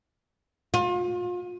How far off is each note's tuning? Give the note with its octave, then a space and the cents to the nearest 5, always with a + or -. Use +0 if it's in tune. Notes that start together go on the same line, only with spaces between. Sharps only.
F4 +35